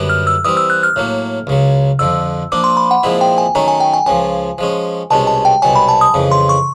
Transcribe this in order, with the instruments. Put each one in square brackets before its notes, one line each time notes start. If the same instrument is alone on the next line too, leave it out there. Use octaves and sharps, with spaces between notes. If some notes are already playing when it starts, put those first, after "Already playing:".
Already playing: [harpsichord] F#2 D3 G3 B3
[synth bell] F6
E6
[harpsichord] E3 G3 C4 [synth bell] D#6
[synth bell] E6
F#6
F6
[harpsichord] A2 F#3 A#3
C#2 C#3 F#3
[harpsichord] F2 D3 F3 [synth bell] E6
[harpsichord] F3 A#3 D4 [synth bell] D6
[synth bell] C6
B5
F#5
[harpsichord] A#2 F3 G#3 C4 E4
[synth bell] G5
G#5
[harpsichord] D#3 F#3 A3 C#4 [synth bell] A#5
[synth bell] G#5
G5
G#5
[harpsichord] C#2 C#3 F3 [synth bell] G#5
[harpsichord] F3 G#3 C#4
[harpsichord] C2 B2 G#3 C#4 [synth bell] A5
[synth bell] A5
G5
[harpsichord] C2 B2 F#3 [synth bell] G#5
[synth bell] B5
A5
D#6
[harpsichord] F2 C#3 E3
[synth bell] C6
C#6